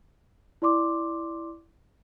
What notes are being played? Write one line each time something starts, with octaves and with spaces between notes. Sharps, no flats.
E4 D5 C6 D6